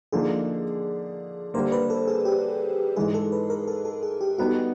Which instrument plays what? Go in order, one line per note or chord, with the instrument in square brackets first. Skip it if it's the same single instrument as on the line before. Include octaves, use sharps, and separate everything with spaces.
[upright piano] D3 F3 A#3 D#4 [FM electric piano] G#4
[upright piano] D3 G3 A#3 [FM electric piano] C5
[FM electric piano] B4
A4
G#4
G4
[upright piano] G#2 E3 G#3 [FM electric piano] G#4
[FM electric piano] A4
B4
A#4
A4
A4
G#4
G4
[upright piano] G3 B3 D#4 [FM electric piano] F#4